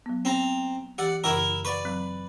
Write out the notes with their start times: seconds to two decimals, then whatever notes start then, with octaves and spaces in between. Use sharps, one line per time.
0.06 F#3 B3
0.25 C4 A#5
0.98 E3 G4 D5 F#5
1.24 F#2 C#3 E3 E4 A#4
1.65 B4 D5 F#5 C#6
1.85 F#3 C4